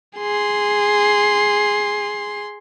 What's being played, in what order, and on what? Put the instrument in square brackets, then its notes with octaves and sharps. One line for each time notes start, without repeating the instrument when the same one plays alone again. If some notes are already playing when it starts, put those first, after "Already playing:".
[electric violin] G#4 C6